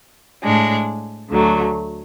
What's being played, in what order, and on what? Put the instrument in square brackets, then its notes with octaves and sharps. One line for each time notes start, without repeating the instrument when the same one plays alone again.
[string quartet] A2 G#3 D4
D2 D3 F#3 A3